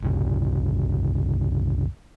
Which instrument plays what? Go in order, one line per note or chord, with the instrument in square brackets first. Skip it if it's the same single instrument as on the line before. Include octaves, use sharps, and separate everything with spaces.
[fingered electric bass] F#1 C2